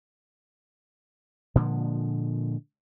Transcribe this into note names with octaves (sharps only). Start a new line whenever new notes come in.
A#2 D3 F3 G#3